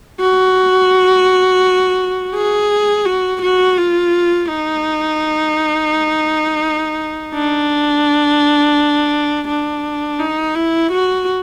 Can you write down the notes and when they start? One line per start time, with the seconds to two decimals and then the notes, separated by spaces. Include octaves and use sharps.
0.20 F#4
2.34 G#4
3.05 F#4
3.42 F#4
3.78 F4
4.49 D#4
7.35 D4
9.48 D4
10.19 D#4
10.55 E4
10.92 F#4